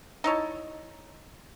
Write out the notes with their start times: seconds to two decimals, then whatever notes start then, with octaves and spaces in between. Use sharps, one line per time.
0.24 D#4 E4 C#5 A5